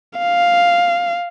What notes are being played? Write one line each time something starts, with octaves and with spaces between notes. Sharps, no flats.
F5